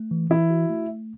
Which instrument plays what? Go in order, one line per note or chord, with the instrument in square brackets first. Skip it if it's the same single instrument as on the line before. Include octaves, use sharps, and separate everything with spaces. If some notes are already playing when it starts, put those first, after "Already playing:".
Already playing: [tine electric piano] A3
E3
[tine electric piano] E3 [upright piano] E4
[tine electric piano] F#4
A3